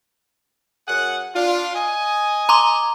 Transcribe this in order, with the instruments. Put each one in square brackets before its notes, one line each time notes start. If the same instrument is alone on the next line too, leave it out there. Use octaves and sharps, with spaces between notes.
[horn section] F#2 G#4 F#5
D4 F4
D#5 G#5
[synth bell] A#5 C6 D6